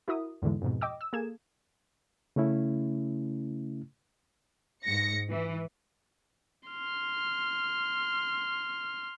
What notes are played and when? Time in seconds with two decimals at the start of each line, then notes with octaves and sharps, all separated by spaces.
0.08 E4 F#4 A#4 E5 D#6
0.42 E2 G#2 D3 E3 G#3
0.62 F2 G#2 B2
0.81 D#5 G5 D6 E6
1.01 E6
1.13 A#3 G#4 A4 G#6 E7
2.36 C#3 A3 C#4 E4
4.86 G#2 A#6 C#7
5.29 E3
6.69 C6 F6